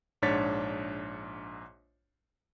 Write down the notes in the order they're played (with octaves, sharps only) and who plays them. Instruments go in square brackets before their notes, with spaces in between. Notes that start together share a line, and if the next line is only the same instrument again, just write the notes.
[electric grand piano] A#1 G#2 D4 C#5 A6 B6